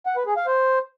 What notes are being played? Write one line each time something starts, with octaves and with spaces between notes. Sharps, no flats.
F#5
B4
G#4
F5
C5